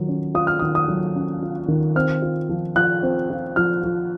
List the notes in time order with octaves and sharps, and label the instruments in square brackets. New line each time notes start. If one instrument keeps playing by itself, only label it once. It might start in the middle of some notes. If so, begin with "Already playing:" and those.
Already playing: [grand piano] D#3 F#3 F4
C#4
F4 D#6
F6
D#3 D#6
D#6
F#3
C#4
F4
D#3
C4 F6
F4
F3
F3 F#6
C4
F4
F3 F6
F3